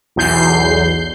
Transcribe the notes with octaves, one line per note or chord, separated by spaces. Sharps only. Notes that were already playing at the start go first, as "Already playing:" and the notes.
B1 E2 G6 C7